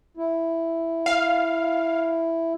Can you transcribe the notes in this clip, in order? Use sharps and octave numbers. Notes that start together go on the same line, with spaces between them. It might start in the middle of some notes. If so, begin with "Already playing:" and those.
E4
F5